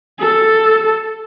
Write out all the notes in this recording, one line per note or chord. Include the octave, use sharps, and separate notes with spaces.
A4